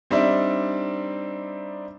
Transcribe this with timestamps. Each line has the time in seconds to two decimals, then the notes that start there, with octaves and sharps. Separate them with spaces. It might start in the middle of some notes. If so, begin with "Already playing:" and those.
0.10 G3 C4 D4 D#4 D5 E5